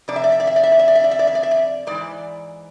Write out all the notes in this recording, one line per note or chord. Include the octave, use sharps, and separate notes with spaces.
F2 C3 D5
E5
D5
E5
D5
E5
D5
E5
D5
E5
D5
E5
D5
E5
D5
E5
D5
E5
D5
G#2 E3 D5